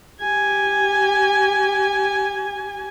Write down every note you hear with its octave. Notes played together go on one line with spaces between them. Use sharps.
G4 G#5